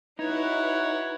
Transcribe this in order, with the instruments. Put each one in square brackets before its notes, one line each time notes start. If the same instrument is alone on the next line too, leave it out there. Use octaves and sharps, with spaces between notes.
[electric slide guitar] D#4 [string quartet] E4 F#4 [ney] B4 [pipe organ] C#5